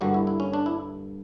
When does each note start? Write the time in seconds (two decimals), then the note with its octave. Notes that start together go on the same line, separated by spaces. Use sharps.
0.01 G2 D3 G3 A#3 F#4
0.14 E4
0.27 E4
0.40 C#4
0.53 D4
0.66 E4